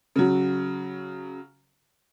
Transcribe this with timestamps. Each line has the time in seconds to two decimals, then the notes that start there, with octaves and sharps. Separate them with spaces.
0.16 C#3 F#3